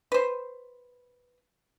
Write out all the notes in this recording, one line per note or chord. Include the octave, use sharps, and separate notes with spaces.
B4 C5